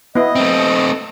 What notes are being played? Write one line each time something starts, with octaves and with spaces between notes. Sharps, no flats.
B3 E4 D#5
A3 C4